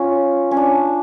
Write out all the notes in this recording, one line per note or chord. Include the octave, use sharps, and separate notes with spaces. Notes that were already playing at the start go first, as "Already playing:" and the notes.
Already playing: C#4 F4
C#4
D4